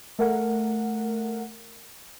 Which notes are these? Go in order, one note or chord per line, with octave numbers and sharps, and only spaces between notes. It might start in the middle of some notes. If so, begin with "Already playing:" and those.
A3 A#4 F#5